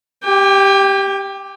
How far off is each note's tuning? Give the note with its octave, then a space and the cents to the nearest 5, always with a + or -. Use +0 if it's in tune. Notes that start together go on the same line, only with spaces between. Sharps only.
G4 +0 G5 +45